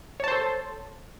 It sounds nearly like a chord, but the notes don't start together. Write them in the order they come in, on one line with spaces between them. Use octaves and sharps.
C#5 A5 C5 A4